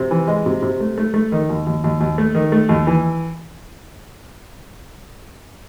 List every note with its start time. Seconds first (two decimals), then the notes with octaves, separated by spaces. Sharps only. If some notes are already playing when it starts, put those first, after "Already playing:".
Already playing: C3
0.11 E3
0.28 G#3
0.46 C3
0.62 C3
0.80 A3
0.98 A3
1.14 A3
1.32 D#3
1.49 D#2
1.67 D#2
1.84 D#2
2.00 D#2
2.18 A3
2.35 D#3
2.52 A3
2.69 D#2
2.87 E3